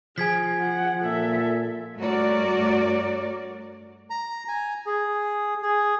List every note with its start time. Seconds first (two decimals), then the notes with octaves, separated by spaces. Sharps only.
0.18 F3 G#4 G#5 G#6 B6
0.60 F#5
1.03 A#2 A4 E5
1.97 G2 A3 F#4 A#4 C#5 D5
4.10 A#5
4.48 G#5
4.86 G#4
5.63 G#4